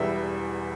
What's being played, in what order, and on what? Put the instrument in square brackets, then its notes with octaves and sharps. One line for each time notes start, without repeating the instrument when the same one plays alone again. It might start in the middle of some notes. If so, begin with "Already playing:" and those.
Already playing: [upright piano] E1 E2 E3 G3 E5